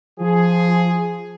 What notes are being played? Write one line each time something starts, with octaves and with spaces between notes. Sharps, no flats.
F3 G#4